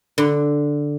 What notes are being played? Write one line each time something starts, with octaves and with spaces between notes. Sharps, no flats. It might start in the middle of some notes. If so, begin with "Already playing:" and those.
D3